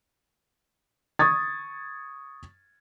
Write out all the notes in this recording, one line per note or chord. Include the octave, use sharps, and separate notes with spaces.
C#6 D#6 G#6 A6